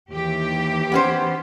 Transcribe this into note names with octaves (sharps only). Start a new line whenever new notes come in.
D#2 E3 G4
B3 C#4 C5